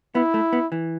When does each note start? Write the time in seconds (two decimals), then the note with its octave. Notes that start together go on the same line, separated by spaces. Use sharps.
0.15 B3 E4
0.34 A3
0.53 B3
0.72 E3